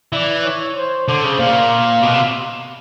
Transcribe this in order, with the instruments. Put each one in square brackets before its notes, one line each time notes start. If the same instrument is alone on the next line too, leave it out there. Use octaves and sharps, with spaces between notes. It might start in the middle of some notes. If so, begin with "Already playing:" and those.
[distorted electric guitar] E3 [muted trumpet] D5
[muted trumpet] C#5
C5
[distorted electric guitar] D3 [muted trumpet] C5
[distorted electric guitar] C#3
[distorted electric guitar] A#2 [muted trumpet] F5
[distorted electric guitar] B2
C3